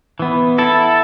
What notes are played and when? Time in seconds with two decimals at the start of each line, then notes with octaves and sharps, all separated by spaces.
0.19 E3 B3
0.58 E4 A4